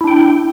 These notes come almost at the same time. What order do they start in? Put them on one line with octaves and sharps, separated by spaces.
E4 D4 G5